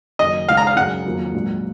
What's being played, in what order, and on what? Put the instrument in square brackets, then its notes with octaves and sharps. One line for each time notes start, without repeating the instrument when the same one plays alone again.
[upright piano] F#1 F#2 D#3 [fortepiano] D#5
[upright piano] C#2 C#3 G#3 D#4 [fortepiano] F5
[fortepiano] A#5
F5
[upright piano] F#2 C#3 G#3 D#4 [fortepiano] F#5
[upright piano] F2 D#3 F#3 A#3
A#1 G#2 F#3